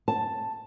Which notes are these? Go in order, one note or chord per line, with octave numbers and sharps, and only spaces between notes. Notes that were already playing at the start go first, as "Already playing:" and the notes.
A5